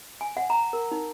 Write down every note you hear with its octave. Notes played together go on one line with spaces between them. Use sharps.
G#5
F#5
A#5
A#4
D#4